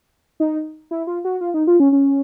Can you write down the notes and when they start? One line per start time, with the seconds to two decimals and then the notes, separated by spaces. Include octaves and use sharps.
0.40 D#4
0.91 E4
1.07 F4
1.25 F#4
1.41 F4
1.54 D#4
1.67 F4
1.80 C#4
1.92 C#4